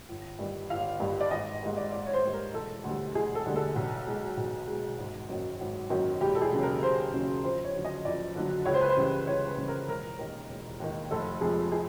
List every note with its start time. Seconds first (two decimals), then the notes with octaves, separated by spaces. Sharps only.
0.09 G1
0.39 G2 D#3 G3
0.70 G1 F5
1.00 G2 D#3 G3
1.21 D5
1.31 G#1 D#5
1.62 G#2 D#3 G3
1.77 D5
1.92 G#1 D5
2.06 C#5
2.13 C5
2.22 G#2 D#3 G3
2.33 A#4
2.54 E1 A4
2.84 D2 D3 G3
3.14 E1 G#4
3.35 A4
3.46 D2 D3 G3
3.56 A4
3.76 B1
4.07 B2 G#3
4.37 B1
4.68 B2 G#3
4.98 G#1
5.29 F#2 D#3 F#3
5.60 G#1
5.90 F#2 D#3 F#3
6.21 E1 G4
6.35 A4
6.42 G#4
6.51 D#2 C#3 F#3
6.63 A#4
6.83 E1 C5
7.13 D#2 C#3 F#3
7.44 F2 C5
7.65 C#5
7.74 D3 F#3
7.85 D#5
8.05 F2 D5
8.36 D3 F#3
8.65 C#2 C#5
8.74 C5
8.81 B4
8.89 C5
8.97 C#3 E3 G3
9.27 C#2 C#5
9.48 B4
9.58 C#3 E3 G3
9.68 A#4
9.88 E1 A#4
10.19 D#2 D#3
10.49 E1
10.80 D#2 D#3
11.11 F1 A4
11.41 F2 C3 F3 G#3 G#4
11.72 G#4